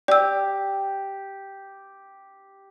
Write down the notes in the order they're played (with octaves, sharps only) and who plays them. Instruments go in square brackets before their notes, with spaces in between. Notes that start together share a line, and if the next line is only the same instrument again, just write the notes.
[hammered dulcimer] G4 [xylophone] D5 E6